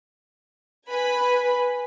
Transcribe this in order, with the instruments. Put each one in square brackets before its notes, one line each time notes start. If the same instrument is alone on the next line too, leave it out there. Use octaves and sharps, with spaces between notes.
[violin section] B4 G#5 B5